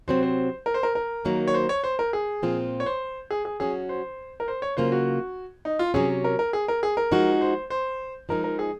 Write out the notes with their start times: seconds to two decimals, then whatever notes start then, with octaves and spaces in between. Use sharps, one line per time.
0.08 C3 F#3 C4 C5
0.23 C5
0.66 A#4
0.74 C5
0.83 A#4
0.95 A#4
1.25 D#3 F#3 A#3 D#4
1.47 C#5
1.54 C5
1.69 C#5
1.84 C5
1.99 A#4
2.13 G#4
2.43 A#2 F3 C4 F4
2.80 C#5
2.86 C5
3.31 G#4
3.45 G#4
3.60 F#3 C#4 F#4 G#4
3.89 C5
4.40 A#4
4.48 C5
4.62 C#5
4.77 C#3 F#3 A#3 F4 C5
4.92 F#4
5.65 D#4
5.79 F4
5.94 C3 F#3 C#4 G#4
6.24 A#4
6.39 A#4
6.53 G#4
6.68 A#4
6.83 G#4
6.97 A#4
7.11 F3 G#3 D#4 F#4
7.41 C5
7.70 C5
8.29 F3 G#3 D#4 A#4
8.44 A#4
8.59 G#4